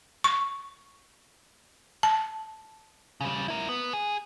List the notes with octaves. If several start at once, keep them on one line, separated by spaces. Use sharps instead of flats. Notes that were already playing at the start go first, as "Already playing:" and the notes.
C#6
A5
C#3 G3
E4 A#4
B3
G#4